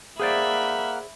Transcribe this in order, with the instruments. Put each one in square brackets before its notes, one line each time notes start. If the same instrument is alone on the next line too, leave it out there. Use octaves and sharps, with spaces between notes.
[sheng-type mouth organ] A#3 F#5 F6 [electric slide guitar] G#4 C5 D5 [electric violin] E5 B5